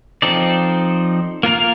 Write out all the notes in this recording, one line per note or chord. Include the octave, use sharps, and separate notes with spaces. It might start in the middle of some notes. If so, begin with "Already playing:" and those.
F3 C4 D#4 A4 D5
A#3 F4 A#4 F5